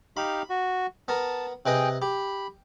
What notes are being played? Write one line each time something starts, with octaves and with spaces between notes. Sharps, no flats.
D#4 G4 F5 B5
F#4
B3 A#4 A5
C3 G#4 B4 D#5 G5
G4 B5